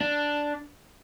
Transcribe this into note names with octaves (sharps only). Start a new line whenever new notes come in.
D4